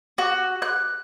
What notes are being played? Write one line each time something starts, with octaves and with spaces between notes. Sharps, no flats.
F#4
F#6